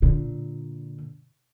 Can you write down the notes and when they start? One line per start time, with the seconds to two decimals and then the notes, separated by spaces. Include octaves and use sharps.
0.02 A#2 D3